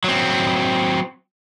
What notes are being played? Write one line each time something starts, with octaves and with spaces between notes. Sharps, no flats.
F#3 C4